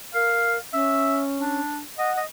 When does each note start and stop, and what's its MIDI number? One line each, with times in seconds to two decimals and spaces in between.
0.14 0.58 70
0.14 0.55 77
0.73 1.60 61
0.73 1.21 76
1.39 1.80 62
1.98 2.12 75
1.98 2.20 78
2.17 2.25 75